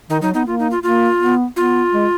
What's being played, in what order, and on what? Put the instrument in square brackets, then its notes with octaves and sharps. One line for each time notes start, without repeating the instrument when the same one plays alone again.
[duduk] D#3 [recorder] D#4
[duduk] F#3 [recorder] D#4
[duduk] B3 [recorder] D#4
[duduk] A#3 [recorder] F4
[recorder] D#4
F4
[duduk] A#3 [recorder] F4
[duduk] B3
[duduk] B3 [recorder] F4
[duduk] G#3